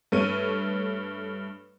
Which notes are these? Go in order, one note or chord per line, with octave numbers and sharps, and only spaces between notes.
G2 A3 C#5 D#7